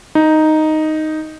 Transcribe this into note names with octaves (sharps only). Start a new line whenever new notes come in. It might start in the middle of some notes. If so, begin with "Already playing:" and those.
D#4